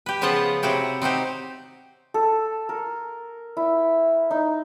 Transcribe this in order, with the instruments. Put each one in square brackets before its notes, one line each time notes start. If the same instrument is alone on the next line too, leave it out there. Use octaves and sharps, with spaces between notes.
[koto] G4 B4
C#3 F3 B3 F4 F#5 A5
C3 F#3 E4 F#4 G4
C4 D#4 F#4 G4
[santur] A4
A#4
E4
D#4